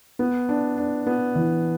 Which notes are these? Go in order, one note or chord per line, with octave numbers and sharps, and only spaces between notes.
B3
D4
D4
B3
E3